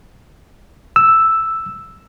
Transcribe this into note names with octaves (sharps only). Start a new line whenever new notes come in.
E6